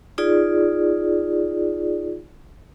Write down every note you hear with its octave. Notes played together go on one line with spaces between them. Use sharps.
D#4 F4 G#4 D5